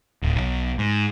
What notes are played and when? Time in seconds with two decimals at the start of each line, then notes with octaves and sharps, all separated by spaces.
0.22 D1
0.36 B1
0.78 G#2